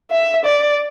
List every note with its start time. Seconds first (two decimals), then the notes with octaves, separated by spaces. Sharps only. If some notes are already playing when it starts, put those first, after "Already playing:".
0.11 E5
0.45 D5